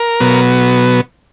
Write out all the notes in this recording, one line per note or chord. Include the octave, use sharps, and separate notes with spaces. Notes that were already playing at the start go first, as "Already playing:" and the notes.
Already playing: A#4
B2 F#3 B3